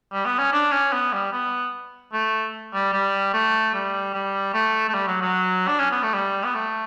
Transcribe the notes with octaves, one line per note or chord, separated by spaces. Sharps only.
G3
B3
C#4
D4
C#4
B3
G3
B3
A3
G3
G3
A3
G3
G3
A3
A3
G3
F#3
F#3
D4
C#4
B3
A3
G3
B3
A3